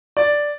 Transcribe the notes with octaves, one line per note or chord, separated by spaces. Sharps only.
D5